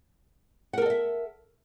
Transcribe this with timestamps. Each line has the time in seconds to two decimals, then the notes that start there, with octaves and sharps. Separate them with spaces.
0.73 F#5
0.78 A#4
0.82 A4
0.86 D#5
0.90 E5